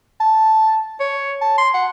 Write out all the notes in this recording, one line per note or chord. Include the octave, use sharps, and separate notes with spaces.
A5
C#5
A5
C6
F#5